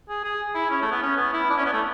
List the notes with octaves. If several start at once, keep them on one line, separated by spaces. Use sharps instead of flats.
G#4
G#4
E4
C#4
A3
B3
C#4
B3
E4
D4
C#4
B3
A3